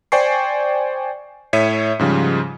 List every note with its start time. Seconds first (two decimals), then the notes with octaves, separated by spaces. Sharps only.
0.12 C5 D5 G5 G#5 C#6 C7
1.53 A2 C#5 E5 B6 C#7 D#7
1.99 G#2 C#3 F3 G3